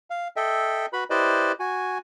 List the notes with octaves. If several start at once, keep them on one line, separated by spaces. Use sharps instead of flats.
F5
A4 D#5 E5 G5
F#4 B4 B5
E4 G4 B4 C5 D5 D#5
F#4 G#5